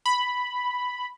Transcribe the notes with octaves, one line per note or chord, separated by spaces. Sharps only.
B5